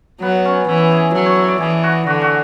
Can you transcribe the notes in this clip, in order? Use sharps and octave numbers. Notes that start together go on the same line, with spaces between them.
F#3 B3
C#4
E3 E4
G#4
F#3 A4
C#5
E5
D5
E3 G#4
F#4
D3 F#4
F#4